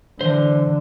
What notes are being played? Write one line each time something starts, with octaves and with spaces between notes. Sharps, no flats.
D3 E3 C5